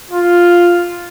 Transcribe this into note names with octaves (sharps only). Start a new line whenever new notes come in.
F4